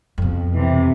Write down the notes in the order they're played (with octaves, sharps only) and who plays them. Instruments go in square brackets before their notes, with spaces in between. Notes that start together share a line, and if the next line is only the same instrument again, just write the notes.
[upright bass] F2 B2
[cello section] C3 E3